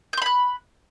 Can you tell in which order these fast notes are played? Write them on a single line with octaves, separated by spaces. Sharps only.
G6 C6 B5 F#6